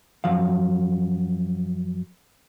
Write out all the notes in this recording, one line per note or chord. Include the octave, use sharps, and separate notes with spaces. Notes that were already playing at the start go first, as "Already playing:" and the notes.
F#2 F3 F#3 F5